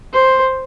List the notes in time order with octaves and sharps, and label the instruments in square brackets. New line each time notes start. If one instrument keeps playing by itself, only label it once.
[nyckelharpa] C5